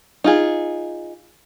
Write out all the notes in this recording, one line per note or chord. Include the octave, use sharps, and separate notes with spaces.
D#4 F4 G#4